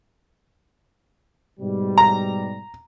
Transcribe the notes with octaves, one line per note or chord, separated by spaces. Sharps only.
G#2 B2 G3
A#5